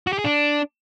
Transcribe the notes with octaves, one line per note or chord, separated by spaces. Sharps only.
F#4
G4
G#4
D4